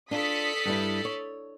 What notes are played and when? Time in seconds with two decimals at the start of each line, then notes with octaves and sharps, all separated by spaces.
0.11 D4 F4 A4 D5 D#6 B6 C#7
0.66 G2 G3 E4
1.05 C#5